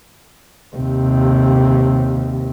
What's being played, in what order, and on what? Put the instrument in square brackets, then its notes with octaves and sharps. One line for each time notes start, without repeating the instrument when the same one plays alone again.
[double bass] D#2 C3